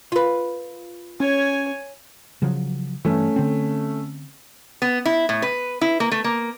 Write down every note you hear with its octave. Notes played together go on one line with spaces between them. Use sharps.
F4 B4
C#4 C#5 G#5
C#3 F3 F#3
G2 E3 A3 C#4
D3 C4
B3
E4
A2
B4
E4
A#3
A3
A#3